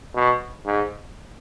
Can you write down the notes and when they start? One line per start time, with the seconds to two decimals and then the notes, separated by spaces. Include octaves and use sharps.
0.15 B2
0.66 G#2